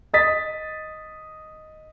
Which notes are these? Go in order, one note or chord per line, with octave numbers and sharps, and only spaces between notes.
D#5 D#6 A6 B6